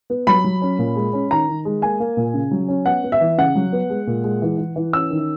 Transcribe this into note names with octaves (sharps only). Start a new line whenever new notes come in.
B3
F#3 B5
F#3
C#4
A#2
G#3
C#4
D#3 A#5
D#3
G#3
A#3 G#5
A#3
A#2
C#3
F#3
C#4
B3 F#5
B3
E5
E3
C#3 F#5
F#3
B3
G#3
A#2
G#3
E3
E3
E3
C#4 E6
D#3